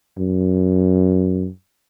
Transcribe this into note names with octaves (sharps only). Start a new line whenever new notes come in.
F#2